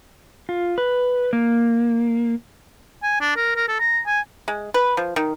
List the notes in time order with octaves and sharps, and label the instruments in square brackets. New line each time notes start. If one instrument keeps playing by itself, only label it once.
[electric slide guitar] F4
B4
A#3
[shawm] G#5
D4
A#4
A#4
A4
A#5
G#5
[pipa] G#3
B4
F3
D#3